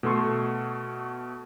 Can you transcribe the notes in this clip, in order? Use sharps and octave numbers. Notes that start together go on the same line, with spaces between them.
B2 A3 A4 C6 C#6